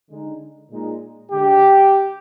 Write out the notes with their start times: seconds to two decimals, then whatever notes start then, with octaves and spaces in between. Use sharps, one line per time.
0.10 D3 G#3 D#4
0.71 A#2 G#3 D#4
1.31 D3 G#3 D4 G4